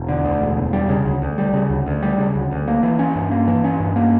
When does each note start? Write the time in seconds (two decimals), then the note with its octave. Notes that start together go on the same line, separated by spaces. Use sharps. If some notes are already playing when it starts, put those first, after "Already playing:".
Already playing: E1
0.09 D3
0.25 D2
0.41 E1
0.57 E1
0.73 G3
0.89 C#3
1.05 D2
1.22 D2
1.38 G3
1.53 C#3
1.70 D2
1.87 D2
2.03 G3
2.18 C#3
2.35 D2
2.51 D2
2.68 A#3
2.83 E3
2.99 C#4
3.16 G2
3.32 A#3
3.48 E3
3.64 C#4
3.80 G2
3.96 A#3